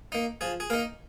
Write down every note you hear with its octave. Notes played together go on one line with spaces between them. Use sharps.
A#3 D#4
F3 G#4
G#4
A#3 D#4 A#4